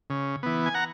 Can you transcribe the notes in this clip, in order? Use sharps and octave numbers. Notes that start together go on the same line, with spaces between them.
C#3
E3 B3
G#5
F#5 A#5